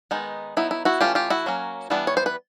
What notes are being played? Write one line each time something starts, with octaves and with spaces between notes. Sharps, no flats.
D#3 G#3 B3 D#4
F#3 B3 D#4 E4
E4
E4 F#4
E3 A3 C#4 F4 G4
F4 G4
E4 F#4
F#3 A#3 C#4
E3 G3 B3 D4
C#5
C5
B4